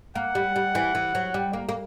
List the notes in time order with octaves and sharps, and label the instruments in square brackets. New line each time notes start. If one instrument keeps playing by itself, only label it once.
[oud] A#3 [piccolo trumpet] F#5
[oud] G3
G3
E3
E3
F#3
G3
A#3
A#3